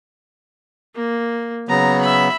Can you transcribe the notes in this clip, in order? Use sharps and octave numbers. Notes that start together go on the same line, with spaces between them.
A#3
C#3 F#3 B3 A#5
E5 B5